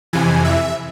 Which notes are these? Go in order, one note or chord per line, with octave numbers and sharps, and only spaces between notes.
F2 C3 E3 G#5
E5